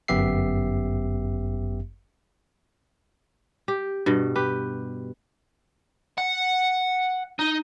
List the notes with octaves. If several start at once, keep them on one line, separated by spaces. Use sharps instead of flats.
G1 F#2 B3 G4 E5 C7
G4
G2 B2
G4 B4
F#5
D#4